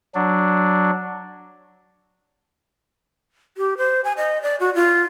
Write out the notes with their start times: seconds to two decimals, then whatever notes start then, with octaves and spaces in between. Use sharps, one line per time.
0.15 F#3 D4
3.57 G4
3.78 C5
4.04 G#5
4.17 D#5
4.42 D5
4.60 F#4
4.75 F4